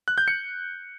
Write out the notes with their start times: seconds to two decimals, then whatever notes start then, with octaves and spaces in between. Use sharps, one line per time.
0.08 F#6
0.18 G6
0.28 C#7